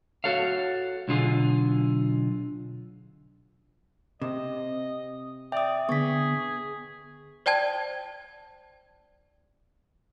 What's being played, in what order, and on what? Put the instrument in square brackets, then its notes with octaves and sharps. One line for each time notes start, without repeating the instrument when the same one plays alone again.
[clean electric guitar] F#4 A4 C#5 F5
B1 D3 F4 G#4
[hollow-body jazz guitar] C3 [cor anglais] D#5
[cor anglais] D5 [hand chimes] E5 D#6 [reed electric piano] G5
[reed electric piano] D3 B3 [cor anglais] G#4 [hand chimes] C#6 B6
[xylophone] C5 D5 G5 A5 G#6